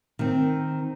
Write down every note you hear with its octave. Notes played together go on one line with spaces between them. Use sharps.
D#3 C4